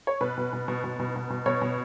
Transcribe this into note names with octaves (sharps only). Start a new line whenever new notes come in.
C#5
B2 B4
B2
B2
B2
B2
B2
B2
B2
B2 C#5
B2